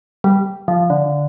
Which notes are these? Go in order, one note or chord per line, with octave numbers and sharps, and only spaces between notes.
G3
F3
D3